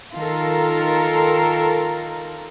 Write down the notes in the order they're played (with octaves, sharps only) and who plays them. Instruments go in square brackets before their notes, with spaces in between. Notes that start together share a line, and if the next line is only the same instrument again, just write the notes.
[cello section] D#3 F4 A4 A#4